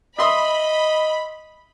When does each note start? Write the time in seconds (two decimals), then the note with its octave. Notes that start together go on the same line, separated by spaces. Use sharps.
0.19 D#5 E5 B5 C6 D#6